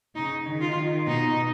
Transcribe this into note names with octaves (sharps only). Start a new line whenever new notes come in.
C#3 D#4
D#3
F4
D#3
B2 D#4